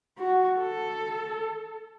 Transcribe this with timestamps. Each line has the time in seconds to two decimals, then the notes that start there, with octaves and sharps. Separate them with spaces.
0.18 F#4
0.58 A4